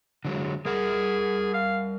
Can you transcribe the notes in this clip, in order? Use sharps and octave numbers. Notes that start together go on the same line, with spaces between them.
D3 F#3 G#3
G3 G#4 A#4 F#5
F5